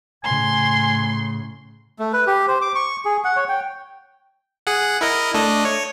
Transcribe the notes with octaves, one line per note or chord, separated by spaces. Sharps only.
A2 C#3 G#5 C6
A3
B4
G4
C5
D6
C#6
G#4
F#5
C#5
G5
G#4 F#5
E4 A#4 D#5
A3 D4 D#5
C#5